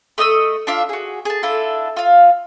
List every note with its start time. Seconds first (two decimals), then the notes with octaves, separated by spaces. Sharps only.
0.18 A3 D#5 D#6 E6
0.67 D4 F4 E5 F5
0.89 F#4 G#4
1.25 G#4 A5
1.43 D4 E4 F4 A4
1.97 F4 F5